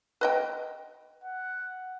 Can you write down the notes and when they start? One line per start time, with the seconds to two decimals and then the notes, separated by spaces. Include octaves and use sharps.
0.21 B4 D#5 G5
1.24 F#5